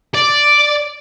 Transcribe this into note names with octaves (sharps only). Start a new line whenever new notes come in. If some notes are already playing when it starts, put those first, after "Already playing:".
D5